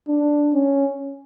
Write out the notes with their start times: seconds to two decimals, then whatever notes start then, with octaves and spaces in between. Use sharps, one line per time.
0.08 D4
0.54 C#4